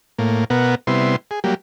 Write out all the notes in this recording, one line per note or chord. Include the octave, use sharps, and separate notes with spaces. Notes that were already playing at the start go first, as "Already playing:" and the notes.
A2 A#3
B2 B3 A#4 F#5
C3 G3 B3 E4 C6
G#4
F#3 G3 A#3 G4